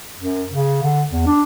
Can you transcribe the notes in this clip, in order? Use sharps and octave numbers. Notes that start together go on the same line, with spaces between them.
F#2
C#3
D3
E2
D4